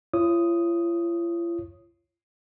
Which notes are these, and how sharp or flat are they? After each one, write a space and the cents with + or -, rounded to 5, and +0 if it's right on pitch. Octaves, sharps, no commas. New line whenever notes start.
F4 -45 C#5 -15 D#6 +0